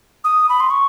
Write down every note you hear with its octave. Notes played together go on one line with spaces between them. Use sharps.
D#6
B5
C6
C#6